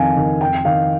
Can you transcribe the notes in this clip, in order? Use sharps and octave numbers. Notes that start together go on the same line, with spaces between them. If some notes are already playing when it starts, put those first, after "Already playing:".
Already playing: F2 D#3 F5 G#5
D#3
F2 G5
D#3 F5